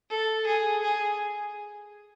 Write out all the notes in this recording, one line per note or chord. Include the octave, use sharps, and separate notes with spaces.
A4
G#4
G#4